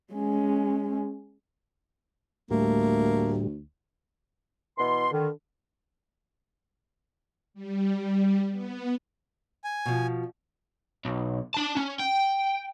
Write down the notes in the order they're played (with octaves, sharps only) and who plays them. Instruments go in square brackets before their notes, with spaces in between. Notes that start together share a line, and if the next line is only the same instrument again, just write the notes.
[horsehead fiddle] G#3 C#4
[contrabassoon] D2 [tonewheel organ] A2 G3 [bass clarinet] A3 [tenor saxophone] A#3
[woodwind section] B2 E3 C6
D3 D#3
[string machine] G3
B3
[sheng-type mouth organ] G#5
[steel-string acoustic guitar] B2 F3
[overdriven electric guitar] B1
D4 A5
C#4
G5